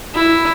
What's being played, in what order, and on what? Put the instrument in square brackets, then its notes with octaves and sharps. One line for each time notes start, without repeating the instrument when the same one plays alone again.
[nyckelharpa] E4